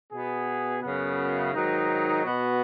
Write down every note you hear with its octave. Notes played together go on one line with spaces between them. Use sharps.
B2 B3 G#4
F#2 C#3 B3
G#2 D#3 F#3 D#4
B2 B3 F#4